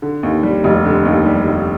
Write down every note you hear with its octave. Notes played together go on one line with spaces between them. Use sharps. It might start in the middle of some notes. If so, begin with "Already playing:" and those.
D3
D#2
G3
F1
D3
D#2
G3
F1